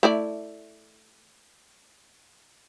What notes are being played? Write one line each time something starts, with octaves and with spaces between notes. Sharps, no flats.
A3 E4 D5